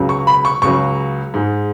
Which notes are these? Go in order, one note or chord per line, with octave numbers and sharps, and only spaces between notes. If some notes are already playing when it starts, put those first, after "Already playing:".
Already playing: C#2 C#3 F#3
C#6
B5
C#6
C#2 C#3 F#3 C#6
G#2 G#3